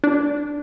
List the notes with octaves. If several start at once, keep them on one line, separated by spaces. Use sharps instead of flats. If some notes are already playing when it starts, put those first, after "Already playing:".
D4